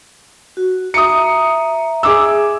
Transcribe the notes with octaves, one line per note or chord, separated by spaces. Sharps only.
F#4
E5 A#5 D#6 C#7
G#4 D6 E6